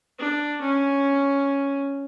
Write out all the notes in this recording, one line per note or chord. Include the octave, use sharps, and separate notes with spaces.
D4
C#4